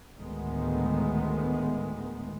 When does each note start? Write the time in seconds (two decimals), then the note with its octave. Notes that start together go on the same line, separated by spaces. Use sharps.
0.17 D2 A2 D#3 G#3 B3